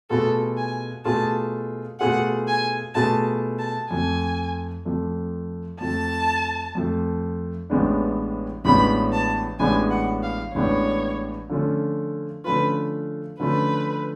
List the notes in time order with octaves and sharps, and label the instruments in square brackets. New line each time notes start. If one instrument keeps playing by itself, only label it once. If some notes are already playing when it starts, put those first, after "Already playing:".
[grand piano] B2 A3 F4 G#4 [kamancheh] A4
[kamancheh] G#5
[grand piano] B2 A3 F4 G#4 [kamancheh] A5
[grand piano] B2 A3 F4 G#4 [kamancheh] F#5
[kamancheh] G#5
[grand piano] B2 A3 F4 G#4 [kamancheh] A5
[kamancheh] A5
[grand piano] F2 F3 A3 [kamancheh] G#5
[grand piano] F2 F3 A3
[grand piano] F2 F3 A3 [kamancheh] A5
[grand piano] F2 F3 A3
A1 A2 G#3 B3 D4
[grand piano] A1 A2 G#3 B3 D4 [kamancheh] B5
[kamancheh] A5
[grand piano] A1 A2 G#3 B3 D4 [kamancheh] G#5
[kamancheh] F#5
F5
[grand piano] A1 A2 G#3 B3 D4 [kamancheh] C#5
[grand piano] D3 F3 A3 C#4 F4
[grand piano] D3 F3 A3 C#4 F4 [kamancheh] B4
[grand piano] D3 F3 A3 C#4 F4 [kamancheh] B4